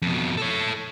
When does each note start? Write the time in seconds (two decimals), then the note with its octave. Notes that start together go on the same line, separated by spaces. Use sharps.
0.02 F2 B2
0.37 A4 C#5